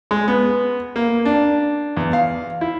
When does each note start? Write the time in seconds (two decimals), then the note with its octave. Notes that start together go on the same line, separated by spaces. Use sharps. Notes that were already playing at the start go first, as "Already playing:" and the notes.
0.11 G#3
0.28 B3
0.96 A#3
1.25 D4
1.97 E2
2.13 F5
2.61 E4